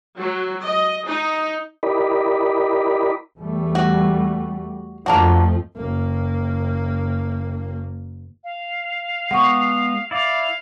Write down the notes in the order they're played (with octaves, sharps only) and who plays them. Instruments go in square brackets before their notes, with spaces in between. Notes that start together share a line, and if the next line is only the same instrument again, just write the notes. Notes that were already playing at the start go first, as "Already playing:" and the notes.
[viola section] F#3
D#5
D#4
[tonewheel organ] E4 G4 A#4 D5 D#5 B5
[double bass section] E2 G3 A3
[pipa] F#4
[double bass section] F2 F3 A3 [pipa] A#3 D4 F#4
[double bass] F#1 A#3
[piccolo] F5
[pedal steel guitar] G#3 B3 [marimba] F#5 C#6
[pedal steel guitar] E4 D5 [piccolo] F5